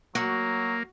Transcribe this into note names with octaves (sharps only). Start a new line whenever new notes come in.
F#3 A#3 F#4